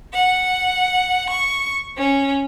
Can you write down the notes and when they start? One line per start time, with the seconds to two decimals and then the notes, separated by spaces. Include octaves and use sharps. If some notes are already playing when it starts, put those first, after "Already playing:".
0.13 F#5
1.29 C#6
1.97 C#4